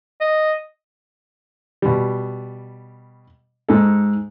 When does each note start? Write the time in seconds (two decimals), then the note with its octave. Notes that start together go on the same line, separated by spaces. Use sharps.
0.21 D#5
1.82 B2 G3
3.69 G#2 A4